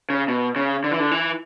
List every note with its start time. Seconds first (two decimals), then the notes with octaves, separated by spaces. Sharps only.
0.10 C#3
0.28 B2
0.56 C#3
0.84 D3
0.91 E3
1.00 D3
1.11 E3